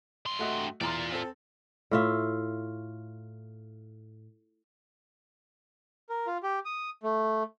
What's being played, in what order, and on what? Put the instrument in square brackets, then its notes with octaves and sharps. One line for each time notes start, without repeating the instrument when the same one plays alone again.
[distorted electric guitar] G2 C6
[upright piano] A3 F#4 D#5
[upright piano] E2 A#5 C6 [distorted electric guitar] F4 D5
[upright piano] C4 A4
[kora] A2 F4 E5
[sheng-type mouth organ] A#4
F4
G4
D#6
A3